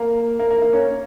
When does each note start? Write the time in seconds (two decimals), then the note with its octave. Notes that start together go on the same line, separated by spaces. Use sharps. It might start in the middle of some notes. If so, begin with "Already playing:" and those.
Already playing: A#3
0.39 A#3
0.50 A#3
0.62 A#3
0.73 C#4